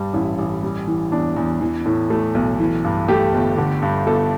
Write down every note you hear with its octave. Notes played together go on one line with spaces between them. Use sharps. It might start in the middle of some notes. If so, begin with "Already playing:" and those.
Already playing: G2 G3
A1 E4
A1
G3
E3
E2 D4
E2
E3
A2
A3
B1
E3
G2
A3 G4
G1
D3
G2
G1 A4